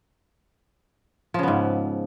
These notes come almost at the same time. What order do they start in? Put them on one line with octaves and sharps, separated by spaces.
F3 C#3 B3 G#2